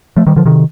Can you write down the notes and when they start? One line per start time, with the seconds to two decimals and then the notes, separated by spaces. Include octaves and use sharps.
0.17 F3 A3
0.27 D#3 G3
0.36 D3 F3
0.46 C3 D#3